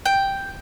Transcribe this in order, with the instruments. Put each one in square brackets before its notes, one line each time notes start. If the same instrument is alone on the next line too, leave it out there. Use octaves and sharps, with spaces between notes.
[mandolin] G5